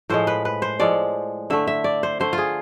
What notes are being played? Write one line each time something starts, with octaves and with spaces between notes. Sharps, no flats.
A2 F3 G#3 C5
B4
B4
C5
A2 F3 G#3 D5
D3 A3 E5
E5
D5
C5
D3 A3 C5
F4
G#4